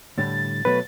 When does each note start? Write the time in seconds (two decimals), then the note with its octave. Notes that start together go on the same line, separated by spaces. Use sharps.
0.18 A2 D3 G3 A6
0.65 B2 F#3 A3 B4